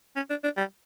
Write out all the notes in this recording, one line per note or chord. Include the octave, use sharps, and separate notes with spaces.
C#4
D4
D4
G3